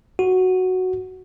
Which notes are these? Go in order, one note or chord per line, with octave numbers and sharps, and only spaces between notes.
F#4